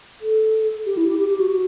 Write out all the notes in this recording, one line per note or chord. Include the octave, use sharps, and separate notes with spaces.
A4
G4
E4
G4
G4
G4
F#4
F#4